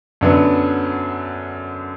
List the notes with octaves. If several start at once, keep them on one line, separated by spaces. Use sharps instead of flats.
F#2 D3 F#3 B3